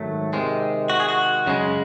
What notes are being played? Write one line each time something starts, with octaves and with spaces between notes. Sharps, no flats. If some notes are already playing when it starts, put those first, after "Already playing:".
Already playing: G#2 D#3 F#3 A3
C3 D#3 G#3
F#4
G#4
F#4
F#2 C#3 G#3